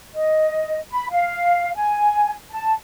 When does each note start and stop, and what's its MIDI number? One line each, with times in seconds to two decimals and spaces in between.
0.15 0.79 75
0.91 1.08 83
1.11 1.71 77
1.75 2.33 80
2.51 2.73 81